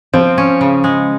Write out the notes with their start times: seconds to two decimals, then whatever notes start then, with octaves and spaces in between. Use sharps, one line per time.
0.13 F3 C4
0.38 C#4
0.61 C#3
0.84 G#3